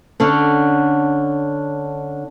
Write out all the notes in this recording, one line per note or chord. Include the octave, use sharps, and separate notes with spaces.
D3 C#4 D4